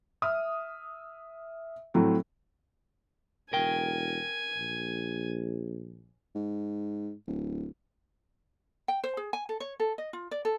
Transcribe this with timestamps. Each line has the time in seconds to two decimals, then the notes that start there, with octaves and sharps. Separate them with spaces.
0.22 E5 D#6 F6
1.94 A2 F#3 A3 C4
3.53 E1 A#4 G5 G#5
4.56 A#1
6.35 G#2
7.27 D1
8.88 G5
9.04 C5
9.17 G#4
9.33 G#5
9.49 A4
9.60 C#5
9.80 A4
9.98 D#5
10.13 F4
10.31 D5
10.45 A4